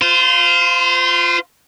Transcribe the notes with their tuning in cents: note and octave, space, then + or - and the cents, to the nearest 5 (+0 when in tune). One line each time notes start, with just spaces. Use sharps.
F4 +0 C5 -30